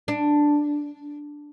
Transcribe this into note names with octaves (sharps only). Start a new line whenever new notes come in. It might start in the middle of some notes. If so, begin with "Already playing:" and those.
D4